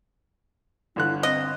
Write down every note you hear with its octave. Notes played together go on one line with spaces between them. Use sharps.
G1 D3 E4 F#6
C4 D#5